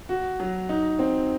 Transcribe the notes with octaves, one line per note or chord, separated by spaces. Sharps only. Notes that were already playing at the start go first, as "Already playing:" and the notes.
F#4
F#3
D#4
C4